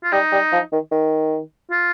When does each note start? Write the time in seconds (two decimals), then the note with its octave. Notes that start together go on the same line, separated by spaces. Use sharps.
0.03 F4
0.12 G3 D#4
0.32 G3
0.52 F3
0.72 D#3
0.91 D#3
1.71 F4